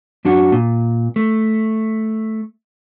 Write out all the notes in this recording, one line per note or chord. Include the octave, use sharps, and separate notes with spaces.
F#2 D4 F#4 F#5
A#2
A3